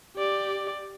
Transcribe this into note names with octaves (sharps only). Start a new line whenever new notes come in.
G4 D5